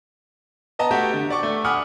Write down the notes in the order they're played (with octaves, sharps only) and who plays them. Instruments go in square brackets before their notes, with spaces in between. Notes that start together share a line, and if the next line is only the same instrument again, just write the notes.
[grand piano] B3 D#5 A5 A#5
A3 F#4 G4 G5
D3
D5 C#6 D6
A3
F#5 G#5 B5 D6 D#6 F6